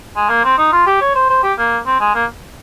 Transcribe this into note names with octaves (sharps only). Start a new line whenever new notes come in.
G#3
A#3
C4
D#4
F4
G4
C#5
C5
C5
G4
A#3
C4
G#3
A#3